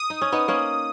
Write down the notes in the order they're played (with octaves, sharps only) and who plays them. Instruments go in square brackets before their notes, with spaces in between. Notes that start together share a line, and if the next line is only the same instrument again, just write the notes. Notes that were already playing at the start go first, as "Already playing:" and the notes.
Already playing: [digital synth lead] D#6
[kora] D#4
C#4
B3 D#4
A#3 C#4